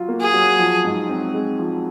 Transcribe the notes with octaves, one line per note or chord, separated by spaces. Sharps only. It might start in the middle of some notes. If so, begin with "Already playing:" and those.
Already playing: F#3 F4
A#3
G#4
F#3
F3
G#2
C4
G#3
F3